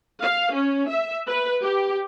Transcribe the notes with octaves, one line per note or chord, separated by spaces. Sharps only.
F5
C#4
E5
B4
G4